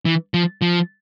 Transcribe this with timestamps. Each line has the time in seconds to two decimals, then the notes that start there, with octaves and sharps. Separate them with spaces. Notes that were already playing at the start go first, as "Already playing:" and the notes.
0.05 E3
0.34 F3
0.62 F3